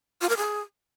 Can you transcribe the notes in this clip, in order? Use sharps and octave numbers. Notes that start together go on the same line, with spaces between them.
F4
A#4
G#4